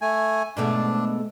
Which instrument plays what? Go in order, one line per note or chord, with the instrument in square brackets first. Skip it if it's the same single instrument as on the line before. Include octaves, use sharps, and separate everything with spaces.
[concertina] A3 G#5
[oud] G#2 B2 A3 [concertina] D4